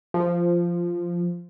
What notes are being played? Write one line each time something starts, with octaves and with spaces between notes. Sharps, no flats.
F3